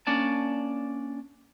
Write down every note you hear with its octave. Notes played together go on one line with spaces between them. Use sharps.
A#3 C#4 D4 D5 A5